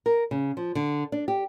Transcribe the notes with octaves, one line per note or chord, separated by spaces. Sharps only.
A#4
C#3
F3
D3
D4
G4